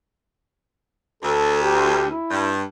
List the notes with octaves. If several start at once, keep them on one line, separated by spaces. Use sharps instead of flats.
D2 A4
G4
E4
G2